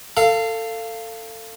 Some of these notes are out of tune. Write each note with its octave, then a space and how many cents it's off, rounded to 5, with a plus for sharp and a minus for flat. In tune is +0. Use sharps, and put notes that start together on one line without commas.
A4 +25 F5 -15